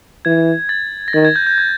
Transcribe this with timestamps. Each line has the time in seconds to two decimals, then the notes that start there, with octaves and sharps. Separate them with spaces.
0.25 E3 G#6
0.69 A6
1.08 A#6
1.13 D#3 A6
1.25 G#6
1.36 G6
1.47 G6
1.58 G#6